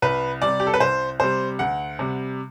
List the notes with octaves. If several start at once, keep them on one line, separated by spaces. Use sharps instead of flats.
C2 B4
C3 G3 D5
G4
A4
B4
C2 C5
C3 G3 C5
D2 F#5
C3 G3